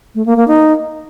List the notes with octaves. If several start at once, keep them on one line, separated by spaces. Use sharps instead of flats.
A3
A#3
A#3
D#4